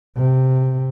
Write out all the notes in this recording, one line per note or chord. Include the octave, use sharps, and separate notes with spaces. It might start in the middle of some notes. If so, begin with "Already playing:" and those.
C3